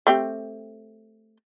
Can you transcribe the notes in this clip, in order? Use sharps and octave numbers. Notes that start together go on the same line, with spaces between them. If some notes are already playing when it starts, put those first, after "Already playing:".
A3 C4 G4